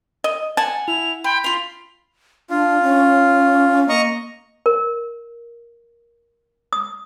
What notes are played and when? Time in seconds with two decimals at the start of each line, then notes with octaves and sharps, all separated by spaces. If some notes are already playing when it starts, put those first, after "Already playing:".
0.24 D#5
0.57 F#5 G#5 A5
0.88 E4 F7
1.24 G5 B5 C6
1.44 F4 C6 F7
2.50 D4 F4
2.83 C#4
3.89 A#3 D#5 A#5 C#6
4.66 A#4
6.73 D#6